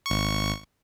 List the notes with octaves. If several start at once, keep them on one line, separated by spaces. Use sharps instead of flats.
G#1 C#6